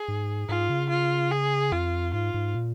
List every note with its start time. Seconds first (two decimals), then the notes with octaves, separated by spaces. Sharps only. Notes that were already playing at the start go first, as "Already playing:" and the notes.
Already playing: G#4
0.08 G#2
0.48 G#2 F4
0.70 C#3
0.90 F4
1.32 G#4
1.72 F2 F4
2.14 G#2 F4
2.34 G#2
2.55 A#2